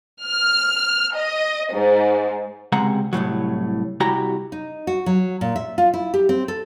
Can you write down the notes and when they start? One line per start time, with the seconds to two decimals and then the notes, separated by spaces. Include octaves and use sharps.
0.24 F6
1.15 D#5
1.73 G#2
2.72 C#2 C3 G#3 F#5 A#5
3.13 C2 F#2 A2 F#3
4.00 C2 E4 F#4 G4 A#5
4.52 D#4
4.87 F#4
5.06 F#3
5.41 A#2
5.56 E5
5.78 F4
5.94 E4
6.14 G4
6.29 C4
6.48 A4